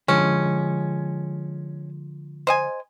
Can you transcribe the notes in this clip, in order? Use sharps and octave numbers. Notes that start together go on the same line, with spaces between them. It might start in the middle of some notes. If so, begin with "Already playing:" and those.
D3 F3 G#3 C#4
C5 D#5 G#5